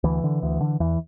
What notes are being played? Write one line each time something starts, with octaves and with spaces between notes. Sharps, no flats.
D2 E3
D3
D2
D3
E2 E3